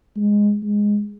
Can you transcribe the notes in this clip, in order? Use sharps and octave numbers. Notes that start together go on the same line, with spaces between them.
G#3
G#3